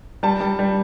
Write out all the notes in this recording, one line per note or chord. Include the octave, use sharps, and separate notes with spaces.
G3 A5
G3
G3